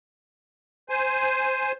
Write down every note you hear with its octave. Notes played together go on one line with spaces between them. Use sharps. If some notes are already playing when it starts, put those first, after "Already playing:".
C5 G#5